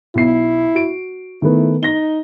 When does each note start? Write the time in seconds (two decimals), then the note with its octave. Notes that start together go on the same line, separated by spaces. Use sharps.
0.15 B1 E4 C7
0.75 F#4 D7
1.42 D#3 A3 B3 E4
1.83 D#4 A#6 G7